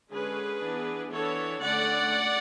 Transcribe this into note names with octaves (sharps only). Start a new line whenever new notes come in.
D3 G#3 C#4 G#4 B4
E3 B3 D4
E3 B3 D4 A4 C#5
D3 A3 C#4 D5 F#5